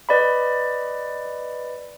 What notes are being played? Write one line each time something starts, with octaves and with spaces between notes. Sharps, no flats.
B4 D5 D#5 B5